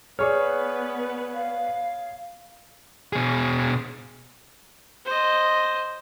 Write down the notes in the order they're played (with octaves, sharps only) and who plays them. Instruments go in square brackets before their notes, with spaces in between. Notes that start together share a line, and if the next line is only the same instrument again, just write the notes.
[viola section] B3 B4 [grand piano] G#4 C#5 [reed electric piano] D5 C#6 F6
[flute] F5
[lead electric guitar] B2 G#4
[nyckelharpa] C5 D#5